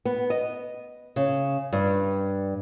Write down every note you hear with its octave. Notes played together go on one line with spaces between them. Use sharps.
B3
D#5
C#3
G2